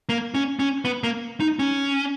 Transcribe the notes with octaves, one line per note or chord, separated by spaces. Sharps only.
A#3
C#4
C#4
B3
A#3
D#4
C#4